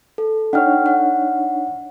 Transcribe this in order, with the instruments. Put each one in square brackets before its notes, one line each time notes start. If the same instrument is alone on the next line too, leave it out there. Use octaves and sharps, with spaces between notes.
[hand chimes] A4
[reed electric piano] D4 D#4 C#5 [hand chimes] F#5 G5 F6
[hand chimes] F#5